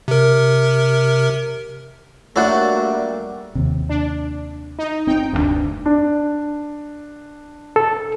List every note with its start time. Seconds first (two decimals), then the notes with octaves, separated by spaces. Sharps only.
0.08 C3 A#4
2.36 F#3 G3 A3 A#3 D4 F#4 F#5
3.55 D#2 C3
3.89 D4
4.79 D#4
5.07 G1 C4 D#4 G5
5.33 F1 D2 G2 B2 D4
5.86 D4
7.76 A4